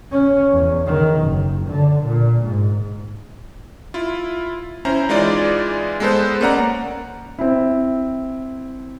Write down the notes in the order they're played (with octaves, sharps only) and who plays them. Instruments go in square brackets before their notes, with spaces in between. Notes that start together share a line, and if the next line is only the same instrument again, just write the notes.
[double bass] C#4
E2
D#3
F#1
D3
A#2
G#2
[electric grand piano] E4 F4
C#4 E4 C5 A#5
E3 G#3 D#4 F4 D5
G#3 B3 A4 B4 C5
A#3 C#4 D5 F#5 A#5
[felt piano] C4 E4